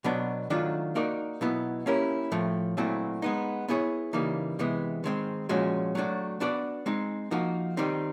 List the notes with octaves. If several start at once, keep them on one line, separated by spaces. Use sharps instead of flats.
B2 F#3 B3 D4
D#3 F#3 A3 D4 F4
A#3 D#4 F#4 A#4 D5
B2 F#3 B3 E4
A#3 C#4 E4 G4 A#4
A2 F3 A3
A#2 F#3 A3 C4 E4
G#3 B3 D#4
B3 E4 G#4 C#5
C#3 E3 G3 A#3 D#4
C3 E3 G#3 B3
D#3 G#3 C4
A#2 F3 G#3 C#4 F#4
F#3 A3 D4 F#4
B3 D4 F#4 B4 D5
G#3 C4 D#4
F3 A#3 D#4 F#4
D#3 G3 C4 D#4